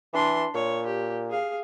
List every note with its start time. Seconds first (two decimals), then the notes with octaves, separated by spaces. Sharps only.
0.13 E3 D4 C6
0.54 A#2 C#5
0.86 G4
1.29 G#4 F5